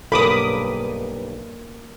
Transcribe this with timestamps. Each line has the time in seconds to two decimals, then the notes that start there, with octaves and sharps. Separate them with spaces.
0.12 B1 G2 A#3 A4 A#4 B5 D6 D#6